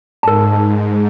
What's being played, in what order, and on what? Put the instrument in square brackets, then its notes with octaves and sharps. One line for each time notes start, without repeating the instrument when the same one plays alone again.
[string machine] G#2 [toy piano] A#4 A5